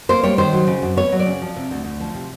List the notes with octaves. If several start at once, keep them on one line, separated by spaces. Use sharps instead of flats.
A#3 C5
G3 C#5
D#3 C5
F#3
C#3
F#2
B3 C#5
F#3
D5
C#3
F3
C3
D2
D2
F3
C3